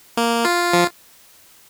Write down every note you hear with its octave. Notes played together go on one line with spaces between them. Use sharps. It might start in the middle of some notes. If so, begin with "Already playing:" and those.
A#3
F4
F3